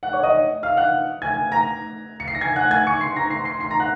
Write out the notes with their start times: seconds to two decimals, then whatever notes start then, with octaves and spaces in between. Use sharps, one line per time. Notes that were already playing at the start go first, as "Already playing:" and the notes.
0.03 F#5 F#6
0.13 C#5 C#6
0.23 D#5 D#6
0.63 F5 F6
0.77 F#5 F#6
1.22 G#5 G#6
1.52 A#5 A#6
2.20 C#7
2.28 C7
2.35 A#6
2.41 G#5 G#6
2.56 F#5 F#6
2.71 G#5 G#6
2.87 C#6 C#7
3.01 C6 C7
3.16 A#5 A#6
3.30 C6 C7
3.45 C6 C7
3.60 C6 C7
3.71 A#5 A#6
3.80 F#5 F#6